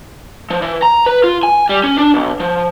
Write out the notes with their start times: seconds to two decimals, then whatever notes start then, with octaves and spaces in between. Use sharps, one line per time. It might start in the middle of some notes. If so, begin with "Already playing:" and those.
0.50 F3
0.62 E3
0.82 A#5
1.06 B4
1.24 F4
1.43 G#5
1.69 G3
1.84 C#4
1.98 D4
2.14 B1
2.40 F3